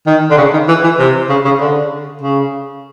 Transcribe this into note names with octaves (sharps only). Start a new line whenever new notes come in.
D#3
D3
C#3
D#3
E3
E3
C3
C#3
C#3
D3
C#3